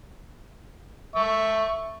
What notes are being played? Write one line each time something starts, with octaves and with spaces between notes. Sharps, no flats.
E5 C#6